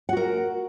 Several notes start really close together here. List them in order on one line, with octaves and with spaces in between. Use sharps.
F#5 F#4 A#4